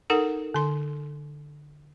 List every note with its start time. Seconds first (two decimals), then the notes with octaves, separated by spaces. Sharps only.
0.10 D#4 A4 A#4 F#5
0.54 D3 C6